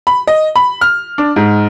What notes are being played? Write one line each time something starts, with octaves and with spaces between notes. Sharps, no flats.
B5
D#5
B5
F6
D4
G#2